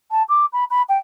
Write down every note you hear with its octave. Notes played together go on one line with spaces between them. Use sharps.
A5
D6
B5
B5
G5